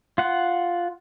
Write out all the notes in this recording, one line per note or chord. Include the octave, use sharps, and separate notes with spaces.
F4 F#5